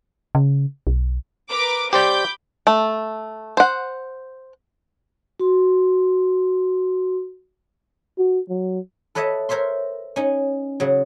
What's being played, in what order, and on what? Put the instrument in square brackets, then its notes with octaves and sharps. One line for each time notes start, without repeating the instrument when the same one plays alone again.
[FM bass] C#3
B1
[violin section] A#4 B4 D6
[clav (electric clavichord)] G4 C5 D5 [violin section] B5 D6 G6
[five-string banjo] A3
C5 F#5
[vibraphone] F#4 C6
[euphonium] F#4
F#3
[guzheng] A4 B4 C#5 D#5 E5 A5
A#4 C5 C#5 E5 C6
C#4 D#4
C#3 F#3